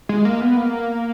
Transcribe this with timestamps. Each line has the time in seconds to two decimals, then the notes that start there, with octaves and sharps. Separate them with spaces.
0.09 G#3
0.25 A#3
0.41 B3
0.57 A#3